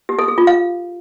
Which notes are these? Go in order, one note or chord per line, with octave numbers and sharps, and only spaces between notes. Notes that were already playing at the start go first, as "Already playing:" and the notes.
G4
A4
G#4
F4
F5